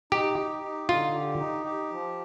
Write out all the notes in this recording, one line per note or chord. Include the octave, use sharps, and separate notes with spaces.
D#4 G4
G4
D#4
D3 F4
G4
D#4
G4
F3